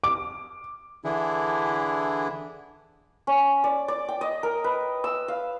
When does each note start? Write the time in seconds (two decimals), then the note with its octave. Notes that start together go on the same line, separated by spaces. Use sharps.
0.04 D6
1.05 D3 E3 D4 E4 G#4
3.27 C#4
3.64 D5
3.88 D5
4.09 G5
4.21 D#5
4.43 A#4
4.64 B4
5.04 E6
5.28 F5